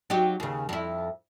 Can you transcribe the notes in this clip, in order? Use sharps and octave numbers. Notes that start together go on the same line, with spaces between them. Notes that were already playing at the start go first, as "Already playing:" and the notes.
F#3 D#4 G4
D#2 C#3
F2 E4